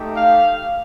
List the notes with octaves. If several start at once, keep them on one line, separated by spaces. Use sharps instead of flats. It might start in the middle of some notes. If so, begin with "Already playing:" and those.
Already playing: A3 D#4 G4
F5